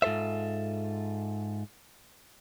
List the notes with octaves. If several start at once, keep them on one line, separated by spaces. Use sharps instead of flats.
G#2 F4 A4 C5 E5